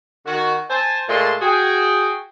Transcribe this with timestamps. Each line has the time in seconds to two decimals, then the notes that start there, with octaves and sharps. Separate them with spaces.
0.26 D#3 F#4
0.70 C5 G#5 A5
1.08 A#2 G#3 A3 A5 C6
1.42 F#4 G#4 G5